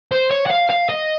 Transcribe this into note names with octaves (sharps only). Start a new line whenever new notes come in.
C5
C#5
F#5
F5
F5
D#5